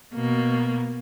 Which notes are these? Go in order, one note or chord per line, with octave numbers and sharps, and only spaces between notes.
B2 A#3